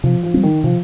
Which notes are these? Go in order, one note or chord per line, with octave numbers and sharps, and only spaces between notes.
C3 F3
F3
G3 C4
D#3
C3 F3